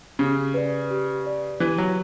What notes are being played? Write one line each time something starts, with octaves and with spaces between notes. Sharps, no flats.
C#3 G4
B4 D5
G4
B4 D5
E3 G4
F#3